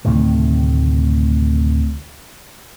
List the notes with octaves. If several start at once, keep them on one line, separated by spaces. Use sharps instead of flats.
D2 A2 C3 D#3